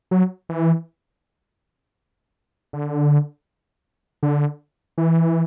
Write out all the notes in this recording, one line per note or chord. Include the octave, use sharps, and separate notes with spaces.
F#3
E3
D3
D3
E3